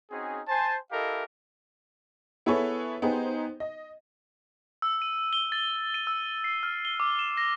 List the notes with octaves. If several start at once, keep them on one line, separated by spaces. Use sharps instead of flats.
C4 C#4 D#4 F#4 G#4
C5 G#5 A5
E4 G4 A4 A#4 D#5 F5
B3 E4 G#4 A4 B4 C#5
B3 D#4 G4 G#4 C5
D#5
E6
D#7
G7
A6
D#7
E6
C7
F6
G7
D6
E7
A#6